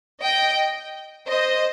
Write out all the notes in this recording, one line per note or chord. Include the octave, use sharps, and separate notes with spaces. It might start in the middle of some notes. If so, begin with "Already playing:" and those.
D#5 G5
C5 D#5